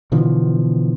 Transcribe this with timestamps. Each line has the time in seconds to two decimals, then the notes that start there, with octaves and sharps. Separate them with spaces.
0.12 B2 D3 E3 F3